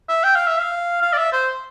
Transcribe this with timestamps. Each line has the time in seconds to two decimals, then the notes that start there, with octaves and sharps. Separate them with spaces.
0.09 E5
0.23 G5
0.35 F5
0.47 E5
0.60 F5
1.02 F5
1.13 D5
1.17 E5
1.32 C5